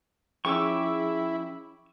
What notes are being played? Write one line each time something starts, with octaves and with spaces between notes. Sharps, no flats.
F3 C#4 E4 G#4 G5 C#6 D6 E6